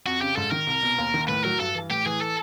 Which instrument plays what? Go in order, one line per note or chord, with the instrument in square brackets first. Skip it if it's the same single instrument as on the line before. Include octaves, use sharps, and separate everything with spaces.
[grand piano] F2 [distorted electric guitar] F#4
[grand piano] C#3 [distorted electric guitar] G4
[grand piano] G#2 [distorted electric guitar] A4
[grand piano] D#3 [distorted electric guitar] A#4
[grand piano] C2
B2
D#2
D#3
[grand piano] A2 [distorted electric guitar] B4
[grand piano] F#3 [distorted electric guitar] A#4
[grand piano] G2 [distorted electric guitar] A4
[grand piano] E3
[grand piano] A2 [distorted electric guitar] G4
[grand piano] E3 [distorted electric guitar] G#4
[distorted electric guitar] A4